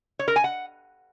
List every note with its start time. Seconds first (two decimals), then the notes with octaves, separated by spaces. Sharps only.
0.19 C#5
0.28 A#4
0.36 G#5
0.44 F#5